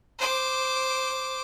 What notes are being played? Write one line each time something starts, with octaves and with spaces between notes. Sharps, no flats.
C5 D6